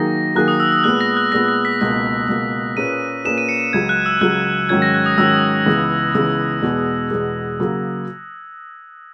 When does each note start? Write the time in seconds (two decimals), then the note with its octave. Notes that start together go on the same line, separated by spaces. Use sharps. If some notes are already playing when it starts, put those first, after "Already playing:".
Already playing: D#3 F#3 A#3 D#4 G#4 A#6
0.35 D#3 F#3 A#3 D#4 G#4 F#6
0.48 D#6
0.60 E6
0.72 E6
0.84 A#2 G#3 B3 F#6
1.01 A#6
1.17 F#6
1.32 A#2 G#3 B3 A#6
1.48 A#6
1.65 B6
1.81 C#2 B2 A#3
2.28 C#2 B2 A#3
2.77 A#2 A#3 C#4 G#4 B4 D#7
3.25 A#2 A#3 C#4 G#4 B4 E7
3.38 D#7
3.49 C#7
3.73 C#2 C#3 F#3 G#6
3.89 F#6
4.06 E6
4.21 C#2 C#3 F#3 F#6
4.69 G#2 D#3 F#3 C#4 G#6
4.82 A#6
4.94 F#6
5.06 D#6
5.18 G#2 D#3 F#3 C#4 E6
5.66 C#2 C#3 E3 B3
6.15 C#2 C#3 E3 B3 E6
6.62 E2 B2 G#3
7.11 E2 B2 G#3
7.60 C#3 F#3 A#3